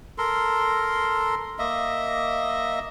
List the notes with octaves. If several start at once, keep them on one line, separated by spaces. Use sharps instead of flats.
A4 A#4 C6
A#3 D#5 E5